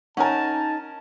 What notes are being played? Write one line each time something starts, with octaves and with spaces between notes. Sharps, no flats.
C#4 D#4 A#4 F#5 G#5 A5